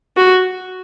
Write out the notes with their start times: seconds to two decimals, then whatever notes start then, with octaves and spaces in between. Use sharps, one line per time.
0.17 F#4